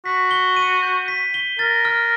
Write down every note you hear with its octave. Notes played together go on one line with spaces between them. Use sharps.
F#4 B6
G7
D#7
G6
B6
G7
A#4 A6
F6